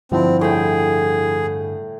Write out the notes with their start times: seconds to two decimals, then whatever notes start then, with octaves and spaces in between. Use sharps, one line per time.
0.12 G2 D3 F3 C4 E4
0.41 A2 G#4 G5